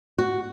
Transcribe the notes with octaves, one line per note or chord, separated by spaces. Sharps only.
F#4